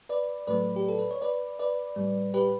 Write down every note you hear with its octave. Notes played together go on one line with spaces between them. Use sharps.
B4 D5
A2 F#3 A3 B4 D5
G4
A4
B4
C#5
B4 D5
B4 D5
A2 G3
G4 B4